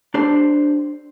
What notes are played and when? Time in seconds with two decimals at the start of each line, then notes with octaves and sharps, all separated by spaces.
0.14 D4 G4 A4 C5 D5 A5